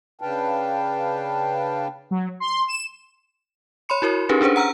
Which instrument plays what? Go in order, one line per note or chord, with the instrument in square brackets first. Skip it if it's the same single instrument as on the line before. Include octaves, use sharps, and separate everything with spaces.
[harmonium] C#3 D4 B4 F5 G5 A5
[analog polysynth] F#3
C6
E7
[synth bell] C#5 B5 C6 C#7
E4 F#4 A#4 C#5
C#4 D#4 G4 G#4 A#4 B4
C#4 D4 G#4 B4 C5
F#5 A#5 E6 F6